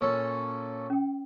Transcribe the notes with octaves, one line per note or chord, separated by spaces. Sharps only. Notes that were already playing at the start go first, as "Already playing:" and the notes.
A#2 C#4 A4
C#4 G5